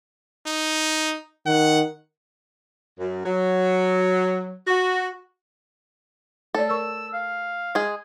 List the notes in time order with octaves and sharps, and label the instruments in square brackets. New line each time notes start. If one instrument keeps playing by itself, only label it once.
[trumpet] D#4
[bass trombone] D#3 [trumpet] F#5
[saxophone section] F#2
F#3
F#4
[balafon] A3 C#5 D5 [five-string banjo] A4
[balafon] A#4 C#6 [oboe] E6
[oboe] F5
[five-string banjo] G#3 G#4